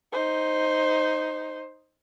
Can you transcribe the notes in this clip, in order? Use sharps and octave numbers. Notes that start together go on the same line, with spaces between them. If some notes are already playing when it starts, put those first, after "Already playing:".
D#4 C5